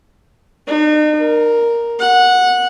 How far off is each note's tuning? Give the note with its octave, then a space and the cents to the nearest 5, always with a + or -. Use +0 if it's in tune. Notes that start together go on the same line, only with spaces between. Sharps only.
D#4 -40
A#4 +5
F#5 -15